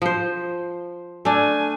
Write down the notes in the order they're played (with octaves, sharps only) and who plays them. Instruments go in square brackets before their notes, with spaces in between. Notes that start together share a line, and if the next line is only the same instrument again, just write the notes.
[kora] F3 C5
[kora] A3 D4 [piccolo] G#5